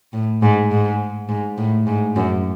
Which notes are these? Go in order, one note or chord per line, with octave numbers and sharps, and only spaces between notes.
A2
G#2
G#2
G#2
A2
G#2
F#2